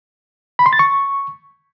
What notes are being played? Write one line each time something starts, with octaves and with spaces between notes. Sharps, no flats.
B5
C6
A6
C#6